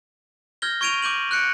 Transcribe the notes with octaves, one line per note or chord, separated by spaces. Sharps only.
F6 G6 G#6 A#6 G7
C#6 G#6 D7 D#7 F7
D6 G6 D#7 F#7
F#6 G6 C#7 D7